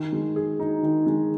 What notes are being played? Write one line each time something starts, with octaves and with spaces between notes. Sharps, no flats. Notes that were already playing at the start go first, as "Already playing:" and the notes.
Already playing: D#3
G#3
G#4
D#4
D#3
G#3